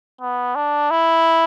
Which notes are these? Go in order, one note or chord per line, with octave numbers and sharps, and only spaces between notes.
B3
D4
E4